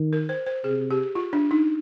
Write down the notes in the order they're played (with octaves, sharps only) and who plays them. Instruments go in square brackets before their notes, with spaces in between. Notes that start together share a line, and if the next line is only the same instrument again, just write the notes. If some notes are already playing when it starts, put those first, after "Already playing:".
Already playing: [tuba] D#3
[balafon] A#4
C5
C5
[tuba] C3 [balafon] G#4
[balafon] G4
F4
D4
D#4